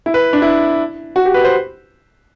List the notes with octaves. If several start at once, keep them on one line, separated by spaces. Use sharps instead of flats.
E4
B4
D4
E4
F#4
G4
B4
C5